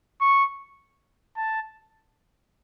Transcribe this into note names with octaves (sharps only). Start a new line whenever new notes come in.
C#6
A5